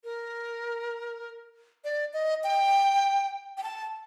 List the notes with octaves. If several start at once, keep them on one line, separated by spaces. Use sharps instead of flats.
A#4
D5
D#5
G5
G5
A5